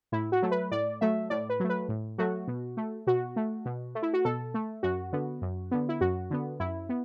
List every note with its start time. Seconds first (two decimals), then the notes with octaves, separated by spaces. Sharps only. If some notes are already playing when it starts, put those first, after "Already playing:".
0.12 A2 E4
0.32 F#4
0.42 F#3 A3
0.51 B4
0.71 A2 D5
1.01 F#3 A3 E5
1.30 A2 D5
1.49 B4
1.60 F#3 A3
1.70 B4
1.89 A2
2.18 F#3 A3 F#4
2.48 B2
2.77 A3
3.07 B2 F#4
3.36 A3
3.65 B2
3.95 A3
4.03 E4
4.13 F#4
4.25 B2 A4
4.54 A3
4.83 F#2 F#4
5.12 D3 B3
5.42 F#2
5.71 D3 B3
5.89 E4
6.01 F#2 F#4
6.31 D3 B3
6.60 F#2 E4
6.89 B3